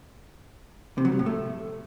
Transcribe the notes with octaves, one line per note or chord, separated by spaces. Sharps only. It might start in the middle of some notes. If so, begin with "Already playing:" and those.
C3
F#3
G3
A2
A3